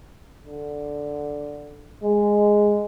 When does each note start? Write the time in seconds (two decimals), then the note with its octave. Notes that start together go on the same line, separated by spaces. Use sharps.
0.45 D3
2.04 G#3